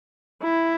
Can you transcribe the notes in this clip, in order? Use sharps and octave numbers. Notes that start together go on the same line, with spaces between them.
E4